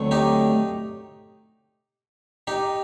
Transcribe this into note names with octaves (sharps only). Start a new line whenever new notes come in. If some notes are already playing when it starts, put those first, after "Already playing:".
Already playing: D2 D3 F#3 A3 C4
D#4 G4
D#4 G4